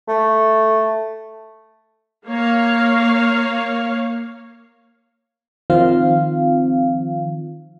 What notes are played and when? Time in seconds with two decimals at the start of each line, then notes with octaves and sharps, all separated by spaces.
0.08 A3
2.27 A#3 C#5 F5
5.70 D#3 F3 C4 F4 F5